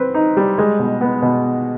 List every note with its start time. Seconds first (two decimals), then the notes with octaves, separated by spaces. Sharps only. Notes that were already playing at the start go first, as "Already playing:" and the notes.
Already playing: C4 B4
0.14 D#4
0.37 G3
0.58 G#3
0.79 B2
1.01 B3
1.22 B2